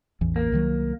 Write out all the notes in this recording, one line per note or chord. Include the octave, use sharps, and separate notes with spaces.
A1 E2 E3
A#3
C2 D#3 F#3